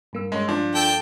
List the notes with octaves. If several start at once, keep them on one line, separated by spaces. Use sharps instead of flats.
G2 A#3 E6
G#3 C#4
F3 D4
A4 G5